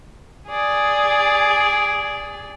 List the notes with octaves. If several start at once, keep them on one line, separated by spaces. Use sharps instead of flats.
G#4 D5